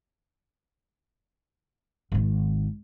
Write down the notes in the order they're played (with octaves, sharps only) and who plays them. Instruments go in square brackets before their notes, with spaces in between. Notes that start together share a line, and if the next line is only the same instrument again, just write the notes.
[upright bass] G#1 D#3